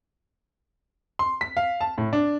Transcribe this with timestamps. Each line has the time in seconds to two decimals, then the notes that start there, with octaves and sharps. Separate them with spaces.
1.19 C6
1.41 B6
1.57 F5
1.81 A5
1.98 A2
2.13 D4